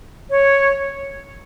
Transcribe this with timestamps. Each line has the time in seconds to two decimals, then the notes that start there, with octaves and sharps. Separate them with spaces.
0.30 C#5